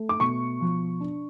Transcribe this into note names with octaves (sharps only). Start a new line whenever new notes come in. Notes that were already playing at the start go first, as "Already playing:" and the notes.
Already playing: A3
D6
B2 C#6
F3
D4